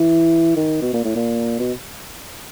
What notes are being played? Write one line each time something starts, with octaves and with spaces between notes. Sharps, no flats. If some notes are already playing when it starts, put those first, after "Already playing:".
Already playing: E3
D#3
B2
A#2
A2
A#2
B2